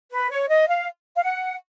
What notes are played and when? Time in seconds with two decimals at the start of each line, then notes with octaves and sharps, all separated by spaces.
0.12 B4
0.30 C#5
0.48 D#5
0.67 F5
1.16 F5
1.22 F#5